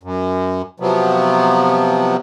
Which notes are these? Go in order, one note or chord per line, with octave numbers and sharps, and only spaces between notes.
F#2
C3 F3 F#3 B3